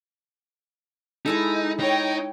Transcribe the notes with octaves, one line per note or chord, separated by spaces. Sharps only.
G#3 D#4 E4 A4
D#4 C#5 G5